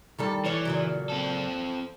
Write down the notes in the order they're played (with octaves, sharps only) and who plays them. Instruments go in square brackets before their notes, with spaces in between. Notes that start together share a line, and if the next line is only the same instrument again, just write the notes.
[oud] D#3 G3 A4
[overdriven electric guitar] E3 [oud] C#4 C#5 D5
[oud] A#2 C#3 F#3
[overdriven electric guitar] C4 A4